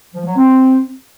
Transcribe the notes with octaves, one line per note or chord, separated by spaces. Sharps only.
F3
F#3
C4